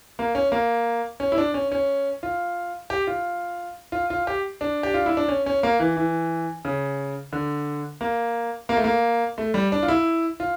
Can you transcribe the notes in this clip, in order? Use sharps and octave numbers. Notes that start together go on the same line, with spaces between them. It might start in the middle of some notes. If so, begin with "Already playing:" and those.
A#3
C#4
A#3
C#4
E4
D4
C#4
C#4
F4
G4
F4
F4
F4
G4
D4
G4
F4
E4
D4
C#4
C#4
A#3
E3
E3
C#3
D3
A#3
A#3
A3
A#3
A3
G3
D4
F4
E4
F4